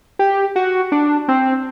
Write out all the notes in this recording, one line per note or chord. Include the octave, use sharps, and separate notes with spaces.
G4
F#4
D4
C4